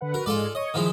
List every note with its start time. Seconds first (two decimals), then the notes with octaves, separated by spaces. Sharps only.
0.01 D3 B4 F#5
0.14 F#4 A#4 B4
0.26 G#2 G#3 F4 A4 D5
0.55 C#5 D#5 C#6
0.74 D#3 F3 G#3 E4 G#4